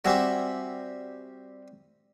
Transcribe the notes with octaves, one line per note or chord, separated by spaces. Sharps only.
G3 C4 F#4 G4 E5 G#5